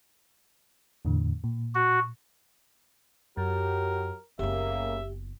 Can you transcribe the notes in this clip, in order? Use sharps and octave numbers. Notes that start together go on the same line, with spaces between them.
E2 A2 D3
A#2
F#4
F#2 F#3 G4 A#4
F#1 C#3 A#3 B3 G4 E5